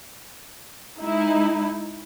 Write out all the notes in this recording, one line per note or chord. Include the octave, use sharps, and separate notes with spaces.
G#3 D#4 E4